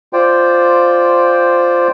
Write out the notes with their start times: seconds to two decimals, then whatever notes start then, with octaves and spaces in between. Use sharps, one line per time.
0.13 F4 C5 D5 G5